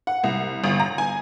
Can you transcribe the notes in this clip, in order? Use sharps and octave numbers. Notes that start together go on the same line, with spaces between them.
F#5
C2
G1
A#5
G#5